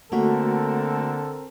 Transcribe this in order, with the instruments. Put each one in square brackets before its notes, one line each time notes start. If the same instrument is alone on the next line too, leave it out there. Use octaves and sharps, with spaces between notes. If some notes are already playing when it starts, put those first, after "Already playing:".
[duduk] D3 [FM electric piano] A3 F#4 [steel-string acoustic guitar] A#3 E5 [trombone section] C4 A4 A#4